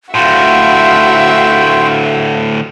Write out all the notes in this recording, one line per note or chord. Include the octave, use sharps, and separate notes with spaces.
D2 A2 F4 F#4 E5 F5 G5